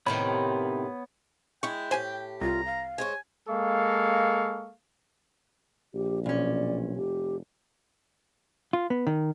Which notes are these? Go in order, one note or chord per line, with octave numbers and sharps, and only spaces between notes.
A2 C3 D#3 B3 C#5 B5
G#3 E4 G5 C#6
A2 G4 C5 G#5
C2 F4 A#5
F5
G#3 C5 C#5 G#5
G#3 A#3 A4 F5 C#6
A#1 G4
B1 C#4 D5
F1 G4
F4
B3
D#3